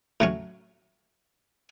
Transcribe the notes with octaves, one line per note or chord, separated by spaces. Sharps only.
A2 F#3 C#4